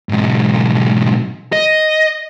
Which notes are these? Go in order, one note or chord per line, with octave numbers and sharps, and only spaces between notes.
B1 G#2
D#5